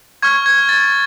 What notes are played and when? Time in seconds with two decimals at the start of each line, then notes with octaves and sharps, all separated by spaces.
0.22 C#6 F6 G#6
0.46 G#6
0.69 A6